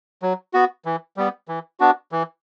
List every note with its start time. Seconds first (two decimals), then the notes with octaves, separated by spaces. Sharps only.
0.22 F#3
0.53 B3 F#4
0.85 E3
1.17 G3 B3
1.48 E3
1.80 B3 D4 F#4
2.12 E3